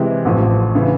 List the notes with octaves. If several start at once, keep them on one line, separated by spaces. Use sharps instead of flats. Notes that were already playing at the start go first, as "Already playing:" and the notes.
Already playing: C3 E3 G#3 C4 E4
A1 A2 F3
C#3 E3